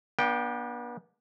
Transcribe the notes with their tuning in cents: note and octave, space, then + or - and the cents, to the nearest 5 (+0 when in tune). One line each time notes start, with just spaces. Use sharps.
B3 -40 D4 +0 G5 +0